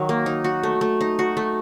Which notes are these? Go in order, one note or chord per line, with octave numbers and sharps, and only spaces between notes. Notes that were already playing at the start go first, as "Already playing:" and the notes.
Already playing: D#3 F#3
A#3
D#4
F#4
A3
A3
D#4
F#4
A3